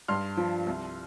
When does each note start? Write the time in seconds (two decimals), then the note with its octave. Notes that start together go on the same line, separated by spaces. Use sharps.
0.08 G2 C6 F6
0.37 F3
0.66 C2